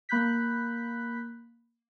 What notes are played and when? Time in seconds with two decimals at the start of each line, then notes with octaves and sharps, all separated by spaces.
0.09 A#3 B5 F#6 G6 B6